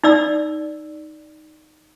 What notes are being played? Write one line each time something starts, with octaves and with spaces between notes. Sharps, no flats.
D#4 D5 E6